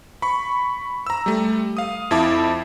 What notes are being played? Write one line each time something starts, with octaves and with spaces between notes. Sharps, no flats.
B5 C#6
A#5 E6
G3 A3
F5 D#6
F2 E4 A5 D6